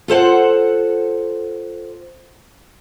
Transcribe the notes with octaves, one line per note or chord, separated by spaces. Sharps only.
F4 A4 C5 F#5